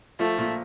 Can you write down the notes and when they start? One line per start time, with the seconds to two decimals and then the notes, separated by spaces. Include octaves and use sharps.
0.19 F3 A3
0.38 A#2